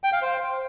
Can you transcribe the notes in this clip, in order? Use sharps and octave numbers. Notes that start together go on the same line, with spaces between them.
G5
F5
C5